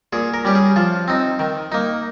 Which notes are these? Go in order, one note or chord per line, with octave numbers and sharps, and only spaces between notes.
A#2 G#4
A#4
G3 C#4 G4
G#4
F3 F4
C4 D#4
D#3
A#3 D#4